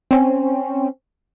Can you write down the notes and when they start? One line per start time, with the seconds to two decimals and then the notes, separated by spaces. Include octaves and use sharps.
0.11 C4 C#4